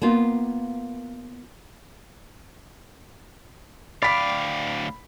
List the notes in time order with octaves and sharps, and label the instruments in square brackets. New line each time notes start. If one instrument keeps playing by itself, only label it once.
[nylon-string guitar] A#3 B3 F4
[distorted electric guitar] D2 F5 [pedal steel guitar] D5 G5 D6 [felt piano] B5 B6